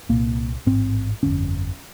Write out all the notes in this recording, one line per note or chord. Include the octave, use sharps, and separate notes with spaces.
C2 A#2 A#3
A1 G#2 C4
G1 F2 D3 C#4